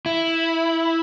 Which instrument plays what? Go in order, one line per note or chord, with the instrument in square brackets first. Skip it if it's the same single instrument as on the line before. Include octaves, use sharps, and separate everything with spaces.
[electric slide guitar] E4